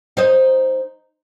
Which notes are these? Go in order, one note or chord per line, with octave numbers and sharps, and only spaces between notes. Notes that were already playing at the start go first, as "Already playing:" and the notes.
D#4 C5 D#5